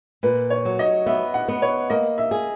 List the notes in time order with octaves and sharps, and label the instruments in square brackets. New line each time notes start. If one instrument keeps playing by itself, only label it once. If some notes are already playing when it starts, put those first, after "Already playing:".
[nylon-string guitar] A#2 [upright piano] B4
[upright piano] C#5
[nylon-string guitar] F#3
[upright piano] D#5
[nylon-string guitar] B3 [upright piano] E5
[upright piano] F#5
[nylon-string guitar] B3
[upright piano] C#5
[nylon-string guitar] A#3 [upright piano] D#5
[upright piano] E5
[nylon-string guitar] G#4